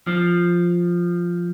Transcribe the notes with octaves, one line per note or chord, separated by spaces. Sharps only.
F3